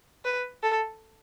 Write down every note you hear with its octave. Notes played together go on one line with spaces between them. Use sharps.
B4
A4